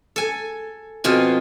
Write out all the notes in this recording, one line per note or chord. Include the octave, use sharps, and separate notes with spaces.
A4 G#5
F2 B2 F4 G#5